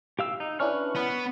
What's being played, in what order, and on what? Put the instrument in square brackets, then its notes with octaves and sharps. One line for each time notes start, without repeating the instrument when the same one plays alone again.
[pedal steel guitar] G4 F5 E6
D#4
[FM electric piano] C#4 D4 E4 [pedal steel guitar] B4 C#6 F6
[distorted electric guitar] B3 [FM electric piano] C#5